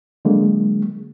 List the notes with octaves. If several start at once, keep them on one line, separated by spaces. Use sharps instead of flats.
D3 F#3 G#3 A#3